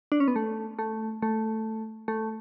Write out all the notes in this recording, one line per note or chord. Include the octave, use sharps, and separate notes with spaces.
D4
C#4
B3
A3
A3
A3
A3